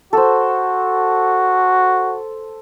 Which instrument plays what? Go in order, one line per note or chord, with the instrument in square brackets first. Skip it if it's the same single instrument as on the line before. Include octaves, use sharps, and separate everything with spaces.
[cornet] F#4 [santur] A4 C5